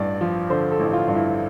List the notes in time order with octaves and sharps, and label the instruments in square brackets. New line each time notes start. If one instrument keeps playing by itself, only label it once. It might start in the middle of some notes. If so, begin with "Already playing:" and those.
Already playing: [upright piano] A1 G2 D5
F3
D3 C5
A4
A1
F4
G2
E4